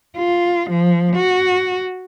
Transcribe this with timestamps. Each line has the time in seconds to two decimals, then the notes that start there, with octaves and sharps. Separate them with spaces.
0.17 F4
0.70 F3
1.16 F#4